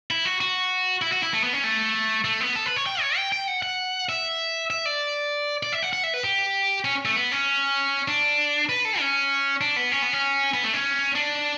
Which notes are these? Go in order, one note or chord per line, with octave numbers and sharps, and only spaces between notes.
E4
F#4
F#4
E4
F#4
E4
A3
B3
C#4
A3
A3
B3
A4
B4
C#5
G5
C#5
G5
G5
F#5
F#5
E5
E5
D5
D5
E5
F#5
F#5
E5
B4
G4
C#4
A3
B3
C#4
D4
B4
A4
C#4
D4
B3
C#4
B3
C#4
B3
A3
C#4
D4